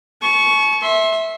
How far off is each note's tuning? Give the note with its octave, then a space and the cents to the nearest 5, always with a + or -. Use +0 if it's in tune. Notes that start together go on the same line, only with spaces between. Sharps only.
A5 -45 C#6 +0
E5 -10 C6 +25